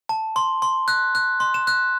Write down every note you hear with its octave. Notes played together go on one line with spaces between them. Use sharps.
A5
C6
C6
F#6
F#6
C6
E7
F#6